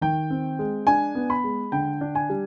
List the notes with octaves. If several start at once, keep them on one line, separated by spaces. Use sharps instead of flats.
D#3 G5
C4
G#3
D4 G#5
B3
B5
G#3
D3 G5
D4
G#5
G3